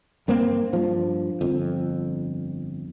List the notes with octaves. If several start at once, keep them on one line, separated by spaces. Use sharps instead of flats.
G2 A#3 C4
G2 F3
G1 F2